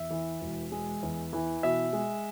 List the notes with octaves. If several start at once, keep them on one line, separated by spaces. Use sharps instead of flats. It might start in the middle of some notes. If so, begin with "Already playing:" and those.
Already playing: E2 E5
E3
E1
G#3
E2
E3
B2 E5
G#3